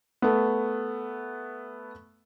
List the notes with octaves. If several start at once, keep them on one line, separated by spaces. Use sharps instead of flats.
A3 B3